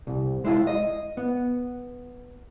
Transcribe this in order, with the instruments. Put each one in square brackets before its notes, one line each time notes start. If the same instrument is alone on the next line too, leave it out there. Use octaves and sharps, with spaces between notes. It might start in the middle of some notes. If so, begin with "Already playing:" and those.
[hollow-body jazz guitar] C2
G#3 E4 F4
D#5
B3